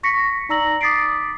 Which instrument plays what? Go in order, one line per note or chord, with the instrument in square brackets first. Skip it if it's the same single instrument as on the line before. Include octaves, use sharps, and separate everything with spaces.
[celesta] C#6 A#6 B6 C#7
D#4 D5 A#5 E6 A#6 F#7
D6 D#6 A6 B6 C7 D7